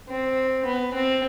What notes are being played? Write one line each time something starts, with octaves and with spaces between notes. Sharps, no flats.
C4
B3
C4